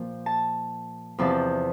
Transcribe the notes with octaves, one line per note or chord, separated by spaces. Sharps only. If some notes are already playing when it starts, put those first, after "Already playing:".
Already playing: A#2 F3
A5
E2 C3 F3 A5